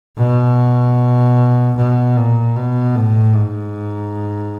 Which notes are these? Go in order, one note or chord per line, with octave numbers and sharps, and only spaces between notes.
B2
B2
A#2
B2
A2
G#2